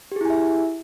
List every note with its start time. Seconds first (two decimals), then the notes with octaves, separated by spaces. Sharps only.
0.12 G4
0.16 G#4
0.21 E4
0.25 G#5
0.30 E5